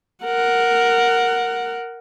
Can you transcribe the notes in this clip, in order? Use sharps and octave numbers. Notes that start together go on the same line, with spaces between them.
A#4 F#5